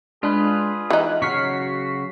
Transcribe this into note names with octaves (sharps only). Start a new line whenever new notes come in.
G#3 D4 F4 G#4 B4
E3 D#4 F#6
C#3 F#3 F#4 C#6 F6 B6 C7